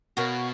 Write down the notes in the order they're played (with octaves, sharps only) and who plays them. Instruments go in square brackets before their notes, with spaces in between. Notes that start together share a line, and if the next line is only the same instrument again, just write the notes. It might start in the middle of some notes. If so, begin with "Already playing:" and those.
[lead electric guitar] B2 [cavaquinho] F#4 A#4 C#5 F5